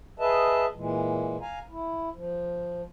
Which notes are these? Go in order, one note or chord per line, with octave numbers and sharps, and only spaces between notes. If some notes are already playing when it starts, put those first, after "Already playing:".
G#4 B4 D#5 E5 A5
A#2 E3 G#3
F5 G#5 A#5
E4
F3